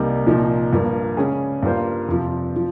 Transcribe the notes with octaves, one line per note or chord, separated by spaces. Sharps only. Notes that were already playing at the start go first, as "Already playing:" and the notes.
Already playing: C2 C3 G3 A#3 D#4
C2 A#2 F3 A#3 D#4
G2 F3 A#3
C#3 G#3 C#4 G#4
G2 G3 A#3 F4 C5
F2 C3 F3
F3